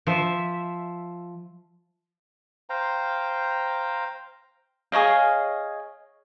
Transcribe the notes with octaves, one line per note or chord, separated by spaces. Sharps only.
F3 E5
C5 F5 G5 A#5
G#4 C#5 D#5 F5